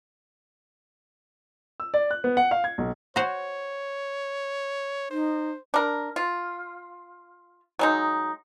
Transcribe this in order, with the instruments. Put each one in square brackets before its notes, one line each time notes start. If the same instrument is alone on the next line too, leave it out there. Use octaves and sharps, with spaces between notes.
[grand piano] E6
D5
F#6
B3
F#5
F5
G#6
B1
[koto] F#4 C5 [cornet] C#5
[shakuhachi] D#4 [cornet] C5
[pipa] D4 A#4
F4
F#3 G#3 D#4